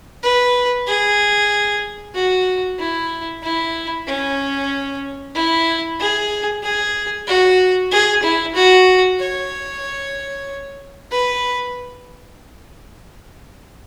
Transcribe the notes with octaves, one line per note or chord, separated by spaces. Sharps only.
B4
G#4
F#4
E4
E4
C#4
E4
G#4
G#4
F#4
G#4
E4
F#4
C#5
B4